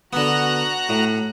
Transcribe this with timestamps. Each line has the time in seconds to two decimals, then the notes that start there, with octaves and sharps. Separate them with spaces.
0.13 D3 B3 F#4 A#5 F#6
0.89 A2